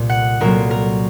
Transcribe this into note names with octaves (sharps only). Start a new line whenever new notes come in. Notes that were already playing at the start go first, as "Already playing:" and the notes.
Already playing: C2 A#2 A#3
F#5
C2 A#2 F#3 A#3 A#4
A#4